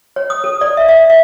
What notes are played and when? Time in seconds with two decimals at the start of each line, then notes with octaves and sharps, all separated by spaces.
0.16 C#5
0.30 D#6
0.44 A4
0.61 D5
0.77 E5
0.89 E5
1.10 E5